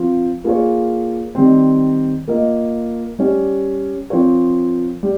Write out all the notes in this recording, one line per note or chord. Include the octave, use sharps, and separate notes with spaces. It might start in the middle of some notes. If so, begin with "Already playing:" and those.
Already playing: F3 C4 F4
A#3 F4 G#4 C#5
D#3 G3 C4
A#3 F4 A#4 D#5
G3 C#4 G4
F3 C4 F4 A#4 C#5
G3